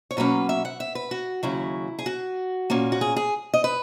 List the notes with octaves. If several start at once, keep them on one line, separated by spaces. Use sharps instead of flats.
C#5
B2 F#3 A#3 C#4 B4
E5
F#5
E5
B4
F#4
D#2 C#3 F#3 E4
G#4
F#4
A#2 A#3 C#4
F#4
G#4
G#4
D#5
B4